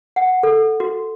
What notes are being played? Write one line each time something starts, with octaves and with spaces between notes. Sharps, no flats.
F#5
A4
F#4